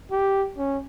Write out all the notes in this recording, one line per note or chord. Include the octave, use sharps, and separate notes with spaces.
G4
C#4